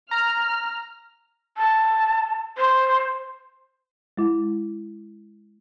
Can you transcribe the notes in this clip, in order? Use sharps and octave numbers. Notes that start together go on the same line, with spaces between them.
A#5 F6
A5
C5
G#3 E4